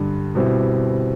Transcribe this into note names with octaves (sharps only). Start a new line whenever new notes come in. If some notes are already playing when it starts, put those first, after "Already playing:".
Already playing: G2 D3 G3
B2 G3 C4 E4